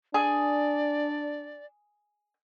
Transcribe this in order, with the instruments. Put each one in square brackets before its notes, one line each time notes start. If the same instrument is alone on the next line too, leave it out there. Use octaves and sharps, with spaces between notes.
[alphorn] D4 [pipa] G#4 [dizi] D5